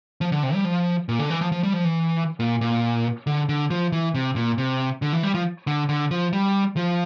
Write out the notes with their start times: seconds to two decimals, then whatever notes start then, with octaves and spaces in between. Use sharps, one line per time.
0.21 F3
0.32 D3
0.43 C3
0.54 G3
0.65 F3
1.09 A#2
1.19 D3
1.30 E3
1.41 F3
1.52 F3
1.63 G3
1.73 F3
1.85 E3
2.40 A#2
2.61 A#2
3.27 D3
3.49 D3
3.70 F3
3.92 E3
4.14 C3
4.36 A#2
4.58 C3
5.02 D3
5.13 E3
5.23 G3
5.35 F3
5.67 D3
5.89 D3
6.11 F3
6.33 G3
6.76 F3